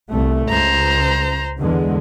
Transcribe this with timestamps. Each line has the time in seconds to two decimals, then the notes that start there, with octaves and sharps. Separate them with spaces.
0.11 C2 A3
0.49 C#2 C5 A#5
1.58 E2 D3 G#3